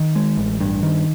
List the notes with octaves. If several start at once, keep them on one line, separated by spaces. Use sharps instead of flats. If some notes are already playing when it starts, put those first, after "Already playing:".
Already playing: D#3
G#3
A1
G2
D#3